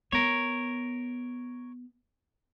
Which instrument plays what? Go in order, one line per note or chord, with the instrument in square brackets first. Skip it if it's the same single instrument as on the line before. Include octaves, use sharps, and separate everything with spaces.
[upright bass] B3 [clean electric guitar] A#4 C#5